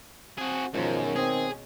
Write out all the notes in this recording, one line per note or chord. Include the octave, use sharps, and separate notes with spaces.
C4 F#4 G#4
F#2 B2 D#3 F3 G#3 C#4
C4 G#4